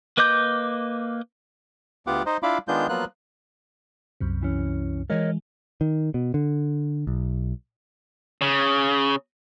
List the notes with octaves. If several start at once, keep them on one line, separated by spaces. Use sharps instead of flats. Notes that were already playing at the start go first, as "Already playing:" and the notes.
A#3 B4 D#5 D6 G6
D2 B3 F4 G4 F#5 D6
D#4 C5 D#5
D4 E4 F4 F5 B5 D6
D#3 G#3 B3 D4 F4 G6
F3 F#3 A#3 B3 F4 F#6
C2 F#2 C3
E3 C#4
E3 G#3 A#4 C#5 D#5
D#3
B2
D3
B1
C#3